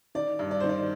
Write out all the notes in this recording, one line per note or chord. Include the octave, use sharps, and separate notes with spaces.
D#3 D5
G2
D5
D#3 C5
D5